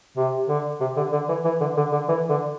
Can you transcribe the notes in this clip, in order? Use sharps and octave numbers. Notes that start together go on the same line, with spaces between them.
C3
D3
C3
D3
D3
E3
E3
D3
D3
D3
E3
D3